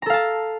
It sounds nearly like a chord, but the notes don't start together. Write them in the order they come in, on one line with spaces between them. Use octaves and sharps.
A#5 A4 F5 A5